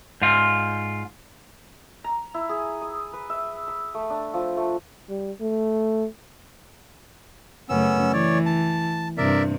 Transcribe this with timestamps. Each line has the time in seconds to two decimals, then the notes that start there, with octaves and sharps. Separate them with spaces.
0.22 G#2 F4
2.04 A#5
2.34 E4
2.49 G#4
2.81 D#6
3.13 B4
3.30 E5
3.68 B5
3.94 A3
4.10 D4
4.34 F3
4.57 A3
5.09 G3
5.41 A3
7.69 F#2 C#3 A3 B3 C#4 E6
8.13 E3 C#5 D5
8.46 A5
9.18 G2 C3 A#4 D5 E5